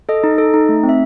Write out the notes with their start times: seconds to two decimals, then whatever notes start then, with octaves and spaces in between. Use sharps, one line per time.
0.09 A4 D#5
0.24 D#4
0.38 A4
0.54 D#4
0.69 A3
0.83 C4
0.89 E5